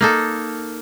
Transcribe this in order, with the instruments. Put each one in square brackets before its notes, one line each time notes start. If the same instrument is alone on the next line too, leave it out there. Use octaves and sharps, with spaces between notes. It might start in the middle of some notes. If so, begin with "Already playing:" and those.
[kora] A#3 D#4 A4